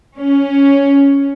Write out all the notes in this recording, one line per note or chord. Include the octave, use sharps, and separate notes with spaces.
C#4